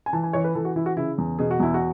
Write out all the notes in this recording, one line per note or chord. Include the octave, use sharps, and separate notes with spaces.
G#5
E3 A5
G#5
E3 C#5
B4
E3 A4
F#4
E3 E4
F#4
C#3 E4
E2
B2 G#4
F#4
E2 E4
F#4